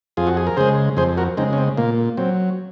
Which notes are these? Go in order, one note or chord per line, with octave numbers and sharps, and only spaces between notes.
F2 F4 G#4
F#4
G#4
A#4
C#3 G#3 G#4 C5
F2 G#4 C5
F#4 A#4
C#3 G#3 C4 D#4
C#4
C4
A#2 A#3
F#3 C4